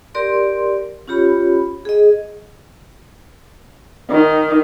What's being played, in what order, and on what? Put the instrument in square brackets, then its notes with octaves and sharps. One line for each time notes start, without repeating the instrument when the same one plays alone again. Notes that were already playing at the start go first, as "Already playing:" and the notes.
[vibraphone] G4 A#4 D5 C6
C#4 F4 G4 C#5 B5
G#4 D#5
[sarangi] D#3